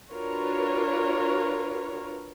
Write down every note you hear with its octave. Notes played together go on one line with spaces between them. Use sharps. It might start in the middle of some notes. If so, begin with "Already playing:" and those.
D4 F4 F#4 A#4 B4 C#5